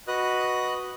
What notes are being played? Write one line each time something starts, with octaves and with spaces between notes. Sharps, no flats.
F#4 B4 D#5 D#6 F#6